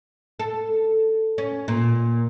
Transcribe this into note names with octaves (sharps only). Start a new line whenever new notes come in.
A4
C#4
A#2